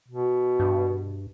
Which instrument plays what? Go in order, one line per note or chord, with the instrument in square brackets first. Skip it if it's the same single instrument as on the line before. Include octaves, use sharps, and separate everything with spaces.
[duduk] B2
[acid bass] G2